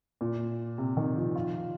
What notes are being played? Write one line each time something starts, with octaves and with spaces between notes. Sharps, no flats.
A#2
C3
D#3
F3
F4